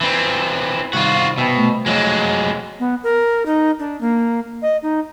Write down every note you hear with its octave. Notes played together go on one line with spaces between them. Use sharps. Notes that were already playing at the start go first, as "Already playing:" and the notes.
E3 C4
G2 C3 D#3 F4 F#4
B2 E5 G5
A3
F2 F#3 G#3
B3
A#4
D#4
D4
A#3
D#5
D#4